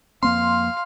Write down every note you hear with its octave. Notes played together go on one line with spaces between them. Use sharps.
F2 A#3 C4 F5 C6